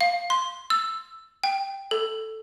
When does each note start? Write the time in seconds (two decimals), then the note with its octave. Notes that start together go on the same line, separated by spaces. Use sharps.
0.01 F5
0.30 C6
0.70 E6
1.44 G5
1.91 A4